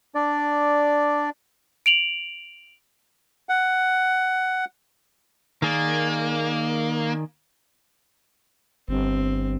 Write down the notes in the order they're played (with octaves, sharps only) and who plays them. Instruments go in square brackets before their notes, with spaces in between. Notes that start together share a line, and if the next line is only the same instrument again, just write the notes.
[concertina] D4 D5
[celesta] D7 F7 F#7
[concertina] F#5
[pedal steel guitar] D#3 G#4 D5 [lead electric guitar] A#3
[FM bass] G1 [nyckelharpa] C4